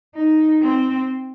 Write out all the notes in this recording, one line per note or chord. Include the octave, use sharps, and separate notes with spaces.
D#4
C4